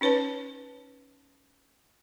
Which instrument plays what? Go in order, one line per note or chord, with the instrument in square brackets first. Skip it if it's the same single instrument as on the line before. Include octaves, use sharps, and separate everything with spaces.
[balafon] C#4 D#4 B4 C#5 A5